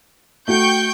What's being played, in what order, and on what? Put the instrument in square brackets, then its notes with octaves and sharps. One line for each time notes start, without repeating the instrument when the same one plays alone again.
[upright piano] A3 F#4 [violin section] G5 C#6 G6